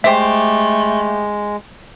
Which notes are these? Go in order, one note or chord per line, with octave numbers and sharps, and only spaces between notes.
G#3 A3 G4 C5 E5 D6